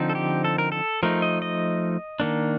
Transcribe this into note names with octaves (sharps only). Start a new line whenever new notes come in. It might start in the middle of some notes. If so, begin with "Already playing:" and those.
Already playing: D3 F3 C4 D#4
A4
G4
A4
A#4
A4
F3 A3 D#4 A#4
D#5
D#5
D#3 A#3 D4